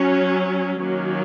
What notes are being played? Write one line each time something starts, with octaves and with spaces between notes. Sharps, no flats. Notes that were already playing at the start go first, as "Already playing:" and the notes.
Already playing: F#3 C#4
D#3 F#3 A#3 C#4